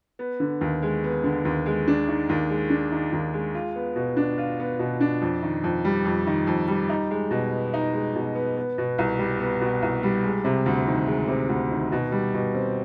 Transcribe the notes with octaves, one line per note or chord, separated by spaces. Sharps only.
B3
D3
D#2
G#3
B3
D3
D#2
G#3
D4
D#3
D#2
G#3
D4
D#3
D#2
G#3
F4
B3
B2
D4
F4
B3
B2
D4
F2
D#3
F2
G3
F2
D#3
F2
G3
D#4
G#3
B2
B3
D#4
G#3
B2
B3
B3
B2
C2
G3
B3
B2
C2
G3
G#3
C3
D2
D#3
G#3
C3
D2
D#3
B2
G3
B2
C4